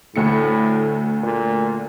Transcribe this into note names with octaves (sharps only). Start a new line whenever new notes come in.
D2 A2 A3 C#7
A#2